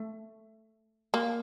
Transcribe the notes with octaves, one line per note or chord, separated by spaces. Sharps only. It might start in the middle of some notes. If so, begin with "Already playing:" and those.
Already playing: A3
A#3